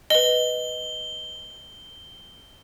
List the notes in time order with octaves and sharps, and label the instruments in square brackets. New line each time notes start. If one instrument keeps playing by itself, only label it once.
[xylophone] B4 D#5 [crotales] G7